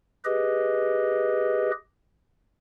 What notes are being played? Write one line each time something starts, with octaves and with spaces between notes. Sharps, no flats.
G4 G#4 B4 D#5